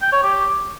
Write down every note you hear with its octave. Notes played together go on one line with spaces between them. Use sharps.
G5
C#5
G4